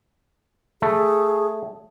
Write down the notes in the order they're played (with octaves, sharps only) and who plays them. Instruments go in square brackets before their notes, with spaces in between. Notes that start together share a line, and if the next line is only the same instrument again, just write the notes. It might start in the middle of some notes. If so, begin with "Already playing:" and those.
[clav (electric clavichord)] A3 [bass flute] G#4